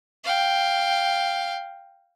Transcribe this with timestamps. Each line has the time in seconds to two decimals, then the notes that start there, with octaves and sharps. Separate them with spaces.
0.24 F5 G5